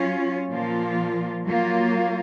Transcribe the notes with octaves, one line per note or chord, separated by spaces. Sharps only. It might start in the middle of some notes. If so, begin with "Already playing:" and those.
Already playing: F#3 C#4 F4
A#2 F3 A#3 F4
F#3 A#3 F4